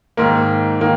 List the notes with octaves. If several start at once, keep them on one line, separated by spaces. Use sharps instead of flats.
G#2 D#3 A#3
D#3 A#3